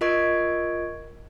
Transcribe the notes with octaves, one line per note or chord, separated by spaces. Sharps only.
F4 A#4 D#5 C#6 G#6 D7